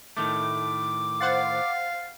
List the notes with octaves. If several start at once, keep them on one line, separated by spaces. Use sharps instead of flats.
A2 D#3 A3 D6
C5 F5 F#5 A6